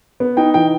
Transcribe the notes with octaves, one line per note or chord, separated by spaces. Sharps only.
B3
D#4 G5
E3 G5